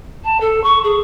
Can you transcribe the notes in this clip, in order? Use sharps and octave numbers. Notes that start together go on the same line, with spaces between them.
A5
A4
C#6
G#4